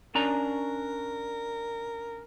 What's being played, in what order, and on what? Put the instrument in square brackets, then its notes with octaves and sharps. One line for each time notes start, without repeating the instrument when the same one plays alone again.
[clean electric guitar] C#4 D4 A#5 [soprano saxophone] A#4